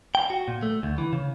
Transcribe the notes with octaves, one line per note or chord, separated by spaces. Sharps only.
G5
F#4
A#2
A3
D2
E3
C#3